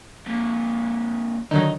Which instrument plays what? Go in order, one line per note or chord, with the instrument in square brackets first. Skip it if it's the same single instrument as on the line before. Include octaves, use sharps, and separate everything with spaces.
[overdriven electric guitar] F2 A#2
[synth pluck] D3 D#3 F#3 [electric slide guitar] D#4